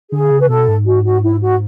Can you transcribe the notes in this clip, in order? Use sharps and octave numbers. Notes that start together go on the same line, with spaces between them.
D3 G#4
C#3
B4
B2 A4
G#2
F#4
F#4
E4
F#4